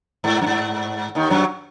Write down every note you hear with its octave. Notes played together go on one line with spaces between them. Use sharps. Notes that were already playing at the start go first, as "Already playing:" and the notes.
G#2
F#2
G#2
D#2 D#3
F#2 F#3